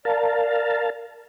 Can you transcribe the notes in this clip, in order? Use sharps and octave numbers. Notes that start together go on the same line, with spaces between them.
A#4 D5 F5 A5